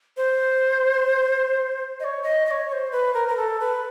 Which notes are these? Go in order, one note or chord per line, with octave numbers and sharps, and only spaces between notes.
C5
D#5
C#5
D#5
D#5
C#5
C#5
C5
B4
A#4
A#4
A4
B4